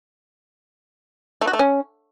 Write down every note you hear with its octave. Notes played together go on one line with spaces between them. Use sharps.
A3
F#4
A3
C#4